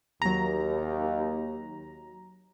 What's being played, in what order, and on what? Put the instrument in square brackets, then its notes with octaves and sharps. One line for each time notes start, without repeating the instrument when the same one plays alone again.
[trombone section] D#2 [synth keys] F#3 A#5